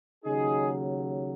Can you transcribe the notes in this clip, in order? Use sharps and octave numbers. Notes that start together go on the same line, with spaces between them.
D#2 C#3 F#3 D#4 G#4